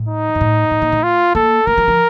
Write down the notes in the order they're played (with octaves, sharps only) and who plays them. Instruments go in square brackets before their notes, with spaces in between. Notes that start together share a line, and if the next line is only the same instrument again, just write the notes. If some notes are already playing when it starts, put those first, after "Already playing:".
Already playing: [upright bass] A2
[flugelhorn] D#4
[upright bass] F#2
A2
A2
A#2
A3
[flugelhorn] F4
[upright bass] A#3 [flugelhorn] A4
[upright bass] A3 [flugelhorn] A#4
[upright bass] F#3
F3